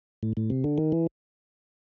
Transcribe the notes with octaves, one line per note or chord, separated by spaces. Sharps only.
A2
A2
C3
D3
D#3
E3